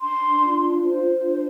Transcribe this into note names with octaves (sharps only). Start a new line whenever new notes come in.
D4 C6
F4
C5
D4